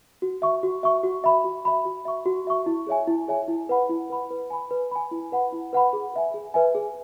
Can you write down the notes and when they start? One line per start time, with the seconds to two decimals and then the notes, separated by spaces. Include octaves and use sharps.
0.22 F#4
0.42 E5 C#6
0.63 F#4
0.83 E5 C#6
1.03 F#4
1.24 E5 B5
1.44 F#4
1.65 E5 B5
1.85 F#4
2.05 E5 C#6
2.26 F#4
2.47 E5 C#6
2.66 E4
2.87 G#4 C#5 E5 G#5
3.08 E4
3.28 G#4 C#5 E5 G#5
3.48 E4
3.69 B4 F#5 B5
3.90 E4
4.10 B4 F#5 B5
4.31 B4
4.50 G#5 B5
4.71 B4
4.91 G#5 B5
5.12 E4
5.32 B4 F#5 B5
5.53 E4
5.73 B4 F#5 B5
5.93 G#4
6.14 B4 E5 G#5
6.34 G#4
6.54 B4 E5 G#5
6.75 G#4